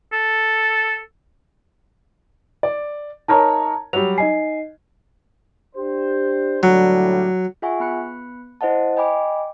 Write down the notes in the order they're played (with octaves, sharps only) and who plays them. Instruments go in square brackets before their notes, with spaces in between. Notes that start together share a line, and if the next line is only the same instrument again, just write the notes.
[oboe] A4
[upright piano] D5
[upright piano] D#4 A#4 C#5 [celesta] A5 A#5
[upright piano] F#3 G3 [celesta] F7
[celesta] D#4 D#5 C7 [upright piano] G#5
[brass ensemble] D4 G4 C5
[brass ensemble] A2 D3 G3 [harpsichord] F#3
[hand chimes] F4 G#4 E5 F#5 G#5 C#6
B3 B5 F#6 C#7
E4 C5 D#5 F#5 A5
D#5 G5 G#5 B5 D6